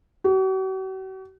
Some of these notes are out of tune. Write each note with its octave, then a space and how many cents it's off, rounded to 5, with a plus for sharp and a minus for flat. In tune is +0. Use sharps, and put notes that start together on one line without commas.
F#4 +45